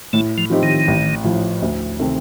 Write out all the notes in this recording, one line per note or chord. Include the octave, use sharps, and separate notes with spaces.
A2 A3
F3
F3 C4 D#4 G4
D#3
A1
A2 F3
D2
C3 D#3 A3 C4